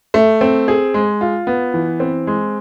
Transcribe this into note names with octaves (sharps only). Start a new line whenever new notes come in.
A3
C4
G#4
G#3
F4
B3
E3
C4
G#3